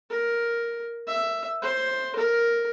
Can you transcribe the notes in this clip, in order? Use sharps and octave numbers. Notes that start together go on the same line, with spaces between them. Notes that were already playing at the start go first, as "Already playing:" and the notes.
A#4
E5
C5
A#4